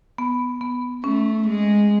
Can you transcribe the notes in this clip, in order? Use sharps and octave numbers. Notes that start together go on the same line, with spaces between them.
B3
B3
A3 C#4
G#3